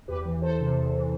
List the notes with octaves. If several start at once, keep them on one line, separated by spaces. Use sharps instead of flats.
E2 G4 B4
E3
E2 A4 C5
C3
E2
E3